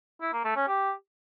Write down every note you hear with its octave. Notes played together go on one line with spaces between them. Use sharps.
E4
A#3
A3
C#4
G4